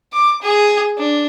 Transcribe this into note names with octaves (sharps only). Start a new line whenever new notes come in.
D6
G#4
D4